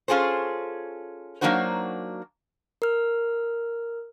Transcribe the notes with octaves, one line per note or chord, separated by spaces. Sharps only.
C#4 F4 G#4 A4 C5
F#3 A#3 D4 D#4 F#4 C5
A#4 F6